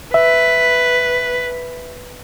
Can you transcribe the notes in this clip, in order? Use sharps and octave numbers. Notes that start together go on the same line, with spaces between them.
B4 E5